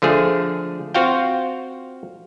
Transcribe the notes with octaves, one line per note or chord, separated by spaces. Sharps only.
D3 F3 A3 G#4
C4 F4 F#4 F5 G5